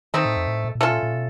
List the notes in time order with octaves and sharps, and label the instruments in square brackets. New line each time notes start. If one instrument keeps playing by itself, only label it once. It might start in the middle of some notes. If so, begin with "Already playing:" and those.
[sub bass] D#3 [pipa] A3 C4 D#4
[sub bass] A2
F2
A2
A#2
A#2
[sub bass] B2 [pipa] A3 C#4 F4 A4
[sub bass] A#2
A#2
B2